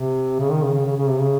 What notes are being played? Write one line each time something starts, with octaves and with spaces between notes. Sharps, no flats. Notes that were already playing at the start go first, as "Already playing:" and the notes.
Already playing: C3
C#3
D#3
C#3
C#3
C#3
C#3
C3
C#3